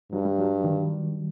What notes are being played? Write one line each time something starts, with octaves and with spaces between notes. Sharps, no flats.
G2 F#3
G3
F#3
D#3